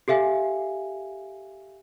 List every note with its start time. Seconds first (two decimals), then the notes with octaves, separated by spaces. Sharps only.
0.08 G4 A4 E5 F5 G#5